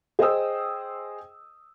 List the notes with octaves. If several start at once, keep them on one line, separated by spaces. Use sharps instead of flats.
G#4 C5 D#5 G5 D#6 E6